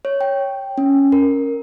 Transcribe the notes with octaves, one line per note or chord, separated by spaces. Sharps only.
C#5
G5
C#4
A#4